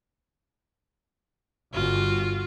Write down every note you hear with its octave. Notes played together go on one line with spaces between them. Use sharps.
G1 F4 F#4